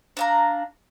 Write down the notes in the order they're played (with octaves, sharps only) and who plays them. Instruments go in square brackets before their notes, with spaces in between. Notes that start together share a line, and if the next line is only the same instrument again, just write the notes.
[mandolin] D4 F5 A#5